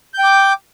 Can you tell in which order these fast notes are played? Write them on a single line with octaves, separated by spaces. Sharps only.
G6 G5 D6